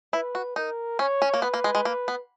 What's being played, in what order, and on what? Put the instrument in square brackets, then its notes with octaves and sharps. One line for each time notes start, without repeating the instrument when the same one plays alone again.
[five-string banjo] E4 [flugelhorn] B4
[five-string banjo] F#4
[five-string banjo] D#4 [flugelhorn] A#4
[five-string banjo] C#4 [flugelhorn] C#5
[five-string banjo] C#4
A#3
[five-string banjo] B3 [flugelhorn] B4
[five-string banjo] A#3
G#3
G#3
A#3
B3